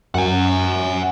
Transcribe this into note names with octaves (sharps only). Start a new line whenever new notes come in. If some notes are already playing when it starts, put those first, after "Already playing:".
F#2 F#5 G#5